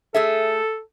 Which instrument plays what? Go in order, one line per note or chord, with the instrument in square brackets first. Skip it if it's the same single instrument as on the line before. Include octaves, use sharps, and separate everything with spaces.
[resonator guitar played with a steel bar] A3 G#4 E5 [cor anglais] A4